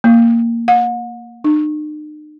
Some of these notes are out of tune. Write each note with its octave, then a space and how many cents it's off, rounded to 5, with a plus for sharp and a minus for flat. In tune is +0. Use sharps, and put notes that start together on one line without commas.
A#3 -5
F#5 -45
D#4 -45